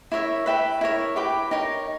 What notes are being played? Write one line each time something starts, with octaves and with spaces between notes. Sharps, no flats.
E4 A#4 C#5 E5
B4 E5 G5 B5
E4 A#4 C#5
G4 B4 G5 B5
D#4 A#4 C#5